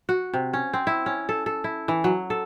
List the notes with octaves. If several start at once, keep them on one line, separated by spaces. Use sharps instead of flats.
F#4
C3
C#4
C4
E4
C#4
A4
A4
E4
E3
F#3
A4